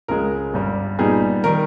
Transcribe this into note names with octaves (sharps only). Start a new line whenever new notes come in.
C#2 C#3 G#3 A#4
G1 G2 G3
A#2 G3 B3 D#4 G#4
D#3 G3 A#4